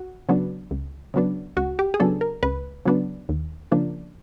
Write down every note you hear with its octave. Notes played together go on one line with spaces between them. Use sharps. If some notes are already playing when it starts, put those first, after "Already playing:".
Already playing: F#4
C#3 F#3 B3 D4
C#2
C#3 F#3 B3 D4
C#2 F#4
G4
G#4
C#3 F#3 B3 D4 A4
A#4
C#2 B4
C#3 F#3 B3 D4
D#2
C#3 F3 A#3 D4